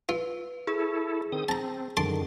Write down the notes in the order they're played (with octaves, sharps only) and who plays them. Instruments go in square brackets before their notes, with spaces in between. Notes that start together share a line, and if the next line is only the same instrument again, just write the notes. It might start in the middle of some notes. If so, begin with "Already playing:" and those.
[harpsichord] F4 [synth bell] B4
[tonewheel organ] E4 A4 [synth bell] G#4
[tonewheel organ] D#3 C4 D#6
[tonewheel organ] C4 [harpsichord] A5 A#5
[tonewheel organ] F#2 D3 D#3 [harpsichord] A5 C6 D6